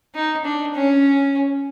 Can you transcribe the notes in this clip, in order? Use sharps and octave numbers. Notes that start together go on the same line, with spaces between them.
D#4
D4
C#4